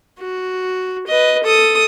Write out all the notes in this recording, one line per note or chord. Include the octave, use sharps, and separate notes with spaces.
F#4
B4 D#5
A4 D#6